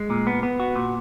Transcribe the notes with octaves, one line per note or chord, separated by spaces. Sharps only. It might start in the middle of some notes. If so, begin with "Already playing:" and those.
Already playing: G#3
A#2
B3
B3
F#4
A#2